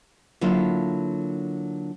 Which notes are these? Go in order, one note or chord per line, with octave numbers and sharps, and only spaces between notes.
D3 F#3 A#3 E4 F4